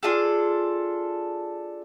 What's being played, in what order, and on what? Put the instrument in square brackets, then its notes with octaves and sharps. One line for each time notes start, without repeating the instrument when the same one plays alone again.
[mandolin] D4 F4 G#4 A4